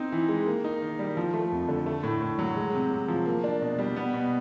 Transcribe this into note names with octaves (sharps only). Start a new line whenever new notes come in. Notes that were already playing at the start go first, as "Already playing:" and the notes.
Already playing: C4 D#4
E3
G#3
A#3
D#4
D#3
G3
F3
A3
F2
D3
A3
A2
A2
F#3
G#3
C3
C3
F3
A#3
D4
B2
G3
B3
B2